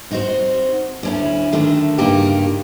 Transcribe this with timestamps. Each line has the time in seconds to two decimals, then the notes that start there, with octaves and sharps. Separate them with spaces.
0.10 C4 D#4 F#4 B4 C5
1.03 D2 C#4 E4
1.53 D3 D#3 A3
1.98 G2 C#3 A#3 D#4 G4